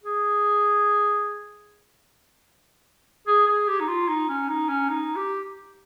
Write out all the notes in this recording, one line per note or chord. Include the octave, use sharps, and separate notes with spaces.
G#4
G#4
G#4
G4
D#4
F4
D#4
C#4
D#4
C#4
D#4
G4